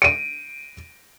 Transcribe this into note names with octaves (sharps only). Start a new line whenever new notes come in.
D7 D#7